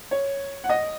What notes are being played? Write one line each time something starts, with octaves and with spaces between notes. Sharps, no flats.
C#5
F#5
D#5